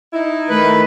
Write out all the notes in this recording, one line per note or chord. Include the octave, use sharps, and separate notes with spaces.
D#4 E4
D#3 A3 B4